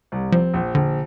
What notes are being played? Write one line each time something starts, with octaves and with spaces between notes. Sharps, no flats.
C2
F3 C4
A#1
A#1 D3